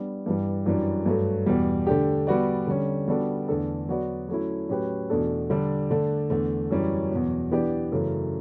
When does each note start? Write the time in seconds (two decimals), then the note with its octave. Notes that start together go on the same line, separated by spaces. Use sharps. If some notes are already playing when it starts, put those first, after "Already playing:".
Already playing: G3 B3 D4
0.26 G2 E3 G3
0.66 F#2 E3 G3 D4
1.06 G2 F#3 A3
1.46 E2 B2 G3
1.87 D3 A3 D4 G4
2.27 G3 B3 F#4 B4 D5
2.67 D3 G3 C#4
3.08 G3 B3 D4 F#4 A4
3.48 E2 D3 A3 D4 A4
3.88 F#3 B3 F#4 B4 D5
4.29 F#3 A3 C#4 E4
4.69 A2 F#3 C#4 G4 B4
5.10 E2 B2 A3 D4 A4
5.50 D3 G3 D4
5.90 D3 A3 D4
6.30 E2 D3 A3
6.70 F#2 E3 G3 C#4
7.11 E2 B2 F#3
7.51 E3 B3 D4 G4 D5
7.92 F#2 C#3 E3 A3